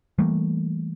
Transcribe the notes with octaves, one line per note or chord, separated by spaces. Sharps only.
E3 G3 A3 A#3